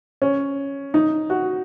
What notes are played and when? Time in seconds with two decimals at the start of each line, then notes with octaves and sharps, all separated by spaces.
0.22 C#4
0.94 D#4
1.30 F#4